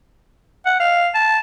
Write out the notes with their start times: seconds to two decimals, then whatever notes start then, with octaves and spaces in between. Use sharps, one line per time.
0.66 F#5
0.80 F5
1.15 A5